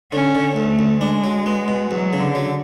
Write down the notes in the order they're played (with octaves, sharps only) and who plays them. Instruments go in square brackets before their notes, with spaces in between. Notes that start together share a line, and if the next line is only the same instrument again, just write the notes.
[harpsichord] D3 [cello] C#4
[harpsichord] D3
[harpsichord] D2 [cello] A3
[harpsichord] D2
[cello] G#3 [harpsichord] D4
[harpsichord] F#3
B3
B2
[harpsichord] E2 [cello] F#3
[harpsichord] C#3
[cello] D3
[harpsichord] F#3